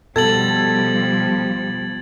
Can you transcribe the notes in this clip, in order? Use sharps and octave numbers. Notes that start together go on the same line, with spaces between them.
B2 F3 G3 A4 G#6 A6 F#7